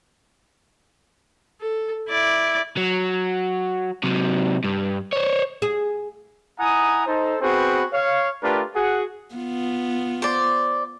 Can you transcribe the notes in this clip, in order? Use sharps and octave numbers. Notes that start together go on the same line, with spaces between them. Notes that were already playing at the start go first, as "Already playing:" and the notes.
A4
E4 D5
F#3
C3 F#3
G2
C5 C#5
G#4
E4 F#5 G#5 A#5 D#6
D#4 A4 C5
B3 C4 F#4 G#4 B4 C5
C#5 F5
A3 D4 F4 G4 A#4 B4
F#4 G#4 F#5
B3 F4
C5 D5